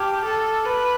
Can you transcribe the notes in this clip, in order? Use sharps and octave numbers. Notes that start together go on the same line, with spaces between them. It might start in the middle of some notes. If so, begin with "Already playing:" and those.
Already playing: G4 A5 D6 F6 G#6
A4
B4